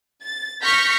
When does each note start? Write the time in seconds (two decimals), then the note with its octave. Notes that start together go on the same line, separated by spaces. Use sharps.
0.24 A6
0.62 C#6 F6 G6 A#6 B6